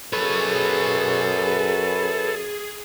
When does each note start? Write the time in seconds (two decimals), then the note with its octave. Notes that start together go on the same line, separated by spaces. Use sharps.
0.13 F#2 G#4 A4 B4 C#5